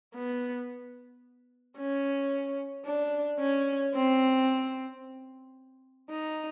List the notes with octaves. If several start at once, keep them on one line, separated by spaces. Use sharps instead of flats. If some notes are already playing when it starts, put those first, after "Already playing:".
B3
C#4
D4
C#4
C4
D#4